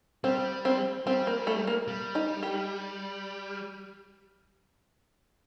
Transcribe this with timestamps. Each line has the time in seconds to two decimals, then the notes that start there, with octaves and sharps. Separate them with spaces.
0.24 G3 C4
0.65 C4
1.07 G3 C4
1.27 A#3
1.47 A3
1.67 A#3
1.88 G3
2.15 D#4
2.43 G4